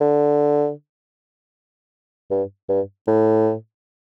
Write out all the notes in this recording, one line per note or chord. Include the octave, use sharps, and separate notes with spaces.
D3
G2
G2
A2